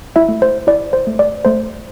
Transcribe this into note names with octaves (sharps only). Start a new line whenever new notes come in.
E4 E5
A3
C5
E4 D5
C5
A3
D5
A3 C5